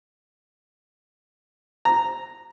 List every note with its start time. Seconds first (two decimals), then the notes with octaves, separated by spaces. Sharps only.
1.85 A#5